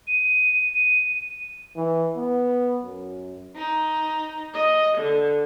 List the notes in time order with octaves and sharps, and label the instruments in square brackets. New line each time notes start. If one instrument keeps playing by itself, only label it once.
[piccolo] D#7
[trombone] E3
B3
F#2
[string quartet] D#4
D#5
D3